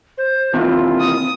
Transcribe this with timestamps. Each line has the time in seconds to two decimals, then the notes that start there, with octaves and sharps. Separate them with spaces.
0.18 C5
0.54 D#2 C3 E3 F4
1.00 D#6